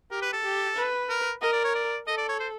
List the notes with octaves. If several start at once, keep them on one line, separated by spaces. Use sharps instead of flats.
G4 A#4
B4
A4
G4
B4
A#4
A#4 D#5
D5
C#5
D5
A4 D#5
D5
C#5
C5